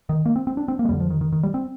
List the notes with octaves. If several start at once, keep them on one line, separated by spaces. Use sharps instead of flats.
D#3
A#3
C4
C4
D4
C4
A#3
G#3
F2 D3 G3
F3
D#3
D#3
D#3
G3
C4